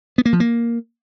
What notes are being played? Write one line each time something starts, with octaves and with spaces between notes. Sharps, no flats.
B3
A#3
F3
A#3